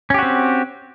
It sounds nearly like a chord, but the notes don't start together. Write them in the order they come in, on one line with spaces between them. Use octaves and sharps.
C#4 G4 F#4 C4